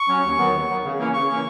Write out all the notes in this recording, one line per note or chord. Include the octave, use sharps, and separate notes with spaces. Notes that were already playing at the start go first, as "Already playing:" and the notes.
Already playing: C#6
F#3 C#4
D#2
D#3 F#3 B3
D#2
D#3 F#3 B3
C#3
E3 A#3 C#4
C#3 C#6
E3 A#3 C#4